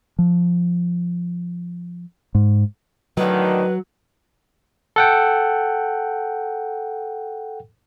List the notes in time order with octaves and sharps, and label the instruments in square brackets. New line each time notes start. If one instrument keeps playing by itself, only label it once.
[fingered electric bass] F3
G#2
[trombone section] A2 D3 D#3 [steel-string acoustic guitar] F#3 [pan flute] B4
[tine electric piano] A4 F#5 G5